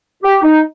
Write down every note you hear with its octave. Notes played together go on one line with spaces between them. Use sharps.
G4
D#4